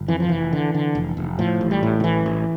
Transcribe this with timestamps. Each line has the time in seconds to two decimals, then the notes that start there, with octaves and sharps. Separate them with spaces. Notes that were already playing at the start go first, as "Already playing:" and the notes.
Already playing: G1
0.08 F2 E3
0.20 F3
0.29 F1 E3
0.53 D3
0.74 D3
0.95 F1
1.17 F1
1.39 A2 F3
1.61 A1
1.71 G3
1.83 A2
2.00 D3
2.04 A1 E3
2.26 A1